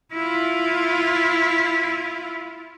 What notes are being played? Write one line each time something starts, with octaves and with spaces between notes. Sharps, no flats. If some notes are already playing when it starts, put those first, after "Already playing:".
E4 F4